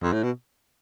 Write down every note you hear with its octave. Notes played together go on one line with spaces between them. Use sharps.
F2
A2
B2